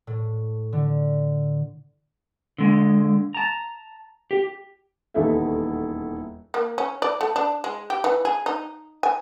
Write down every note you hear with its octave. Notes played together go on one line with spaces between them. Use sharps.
A2
D3
D3 G#3
A5 A#5
G4
D#1 E2 D#4 E4 A4 E5
A#3
C#4
D5
A3
D4
G#3
G4
E3
G#4
D#4
G#5